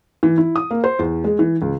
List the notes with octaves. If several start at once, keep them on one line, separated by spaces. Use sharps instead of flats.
E3
E4
D#6
A#3
C5
E2
G#3
E3
C#2